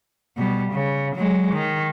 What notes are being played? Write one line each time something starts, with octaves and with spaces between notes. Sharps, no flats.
B2 G3
C#3
F#3 G#3
D#3